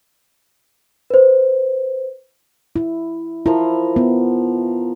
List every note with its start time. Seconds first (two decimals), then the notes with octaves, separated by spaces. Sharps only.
1.10 B4 C5
2.76 E4
3.46 F3 E4 A#4
3.96 B3